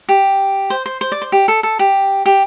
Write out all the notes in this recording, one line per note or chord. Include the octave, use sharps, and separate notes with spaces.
G4
C5
C5
C5
D5
C5
G4
A4
A4
G4
G4